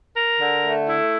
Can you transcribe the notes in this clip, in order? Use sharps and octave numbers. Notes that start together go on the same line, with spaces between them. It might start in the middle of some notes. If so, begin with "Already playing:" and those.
A#4
D3
A3
E4